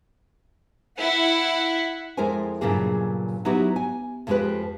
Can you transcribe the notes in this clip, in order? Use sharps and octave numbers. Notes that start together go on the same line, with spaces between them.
E4 F#5
F2 G#3 E4 A#4 C5 G#5
G2 A#2 C#3 F#3 A#3 G#4
F#3 B3 D#4 E4 F#4 G4
G#5
F2 F3 G#3 E4 G4 B4